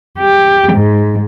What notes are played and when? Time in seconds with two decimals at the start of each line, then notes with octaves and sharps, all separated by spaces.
0.19 G4
0.72 G#2